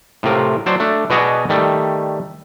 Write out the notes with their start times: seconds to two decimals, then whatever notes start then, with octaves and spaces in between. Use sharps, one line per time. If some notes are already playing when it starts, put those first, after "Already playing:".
0.23 A2 C3 F4 A#4
0.66 F#3 C5 D5 A5
0.80 A3 D4
1.10 B2 B3 F#4 G#4 D5 D#5
1.49 D#3 G3 A3